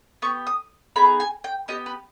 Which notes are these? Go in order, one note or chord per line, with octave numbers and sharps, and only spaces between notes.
B3 G4 C#6
D#6
B3 D#4 G#4 B5
G#5
G5
B3 G4 D#5
B4